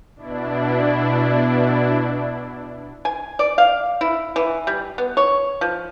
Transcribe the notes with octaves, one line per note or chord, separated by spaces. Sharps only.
B2 D4 E4
G#5
D5
F5
E4
E3
G3
B3
C#5
F3